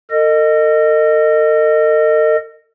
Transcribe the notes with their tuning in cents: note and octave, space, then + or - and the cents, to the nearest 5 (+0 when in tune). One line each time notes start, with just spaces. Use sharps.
A4 +45 D#5 -15